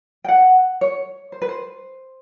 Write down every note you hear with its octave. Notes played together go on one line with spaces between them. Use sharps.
G5
F#5
C#5
C5
B4
C5